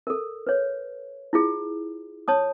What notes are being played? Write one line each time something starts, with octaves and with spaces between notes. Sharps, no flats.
A4 A#4
B4 C#5
E4 F4 G#4
C#5 A5 D#6